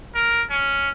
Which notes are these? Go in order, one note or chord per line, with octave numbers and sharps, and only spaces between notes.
A#4
C#4